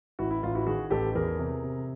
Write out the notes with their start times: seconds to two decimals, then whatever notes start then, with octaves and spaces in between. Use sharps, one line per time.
0.19 A1 E4 F#4
0.31 E4
0.43 A1 F4
0.55 E4 F#4
0.66 D#3 F#4 G#4
0.91 A1 G4 A4
1.15 E2 G#4 A#4
1.39 C3
1.64 C3